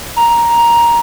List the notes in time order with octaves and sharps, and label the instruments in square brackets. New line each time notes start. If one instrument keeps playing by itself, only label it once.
[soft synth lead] A#5